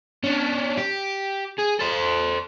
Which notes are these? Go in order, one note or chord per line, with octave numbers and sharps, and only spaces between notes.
C#4 D4
G4
G#4
A4 C5